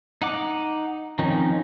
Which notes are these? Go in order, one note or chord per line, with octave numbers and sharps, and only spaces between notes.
D#4 F#5 D6
D#3 F3 C4 C#4 D#4